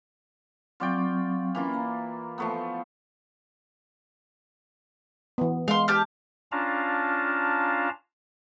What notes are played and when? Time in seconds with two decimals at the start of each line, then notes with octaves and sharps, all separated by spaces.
0.80 F#3 C4 F4 D5 G5 C#6
1.55 E3 A#3 C#4 F4
1.74 A#5
2.38 F3 A3 B3
5.38 E3 B3
5.68 G#3 F5 C6
5.88 G4 A5 F6
6.52 C#4 D4 F4 F5 A5 A#5